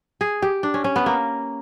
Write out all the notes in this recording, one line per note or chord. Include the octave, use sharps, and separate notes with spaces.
G#4
G4
D4
C#4
C#4
B3
A#3